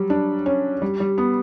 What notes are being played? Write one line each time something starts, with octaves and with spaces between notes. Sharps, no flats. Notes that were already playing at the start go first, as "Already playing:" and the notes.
Already playing: F#3 G3
D4
C#4
G3
G3
B3